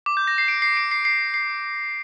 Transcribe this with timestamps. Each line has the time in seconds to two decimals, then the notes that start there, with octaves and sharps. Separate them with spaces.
0.06 D6
0.17 G6
0.28 A#6
0.38 C7
0.48 D7
0.62 C7
0.77 D7
0.91 C7
1.05 C7
1.34 C7